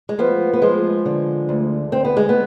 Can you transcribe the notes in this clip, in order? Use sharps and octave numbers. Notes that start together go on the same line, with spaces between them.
G#3
F3 B3
B3
F3 G#3
D3
D2
D3 C4
B3
G#3
B3